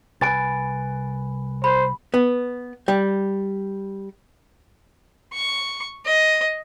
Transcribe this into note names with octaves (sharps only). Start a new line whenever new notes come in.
C2 B4 G#5 A6 D7
C5 B5
B3
G3
C#6
D#5